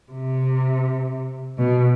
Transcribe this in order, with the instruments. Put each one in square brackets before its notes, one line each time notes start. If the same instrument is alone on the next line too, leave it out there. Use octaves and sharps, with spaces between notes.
[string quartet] C3
B2